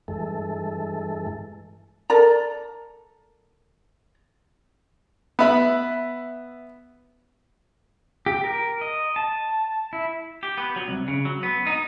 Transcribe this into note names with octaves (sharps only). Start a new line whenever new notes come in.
G2 E3 G#3 A4
A4 A#4 D5 A#5
B3 E5 B5
G4
A#4
D#5
A5
E4
G4
B3
F#3
C2
C#3
F#3
B3
D#4